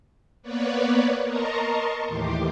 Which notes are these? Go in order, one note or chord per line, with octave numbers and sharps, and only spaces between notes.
A#3 B3 B4 C#5 D5
A#4 D#5 A5 A#5 C6 C#6
D#2 A2 E3 G4 C6 D6